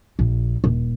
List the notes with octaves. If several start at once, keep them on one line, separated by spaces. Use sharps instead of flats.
A#1
D#1